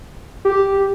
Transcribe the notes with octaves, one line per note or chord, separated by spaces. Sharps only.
G4